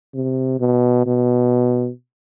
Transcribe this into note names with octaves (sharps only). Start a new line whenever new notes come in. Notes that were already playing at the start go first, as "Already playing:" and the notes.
C3
B2
B2